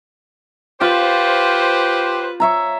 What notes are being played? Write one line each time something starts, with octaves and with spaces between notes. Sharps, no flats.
F4 G4 B4 C5
C#5 E5 A#5